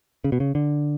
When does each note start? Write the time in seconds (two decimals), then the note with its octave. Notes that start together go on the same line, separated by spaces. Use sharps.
0.24 C#3
0.32 B2
0.40 C#3
0.55 D3